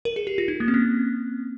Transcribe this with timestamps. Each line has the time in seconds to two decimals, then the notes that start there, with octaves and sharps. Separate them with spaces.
0.05 A#4
0.16 G#4
0.27 G4
0.38 F4
0.48 D#4
0.60 A#3
0.68 C4
0.74 C#4